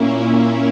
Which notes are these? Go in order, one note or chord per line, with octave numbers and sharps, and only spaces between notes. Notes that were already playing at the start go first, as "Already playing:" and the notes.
Already playing: A#2 A#3 C#4 E4